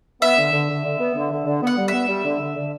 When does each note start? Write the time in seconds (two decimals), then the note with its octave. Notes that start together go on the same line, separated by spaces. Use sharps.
0.21 B3 E5
0.38 D3
0.52 D3
0.69 D3
0.85 D3
0.99 B3
1.15 D3
1.31 D3
1.46 D3
1.62 B3
1.67 F#5
1.77 G3
1.88 B3 E5
2.08 G3
2.25 D3
2.40 D3
2.56 D3